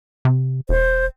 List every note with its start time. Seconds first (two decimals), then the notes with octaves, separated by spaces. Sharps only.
0.25 C3
0.69 E1 C5